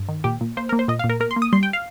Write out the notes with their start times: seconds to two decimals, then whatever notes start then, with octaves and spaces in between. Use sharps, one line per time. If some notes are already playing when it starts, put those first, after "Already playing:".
Already playing: G2
0.08 D#3
0.24 A#2 G4
0.41 A#2
0.57 A#3 C5
0.69 A#3 A#4
0.79 C5
0.88 A#2 D#5
0.99 F5
1.04 A#2
1.09 A#4
1.20 A#3 A#4
1.31 C6
1.36 A#3
1.42 D#6
1.53 G3 C6
1.63 G5
1.73 F5